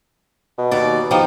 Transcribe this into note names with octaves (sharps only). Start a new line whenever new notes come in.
B2
D#2 D5
F3 D#4 G4